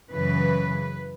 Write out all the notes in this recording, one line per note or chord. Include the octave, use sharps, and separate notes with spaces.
F#2 C#3 E3 B4